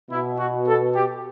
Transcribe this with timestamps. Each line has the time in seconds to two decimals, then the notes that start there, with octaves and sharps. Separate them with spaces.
0.11 B2 E4
0.39 F#4
0.67 A4
0.96 G4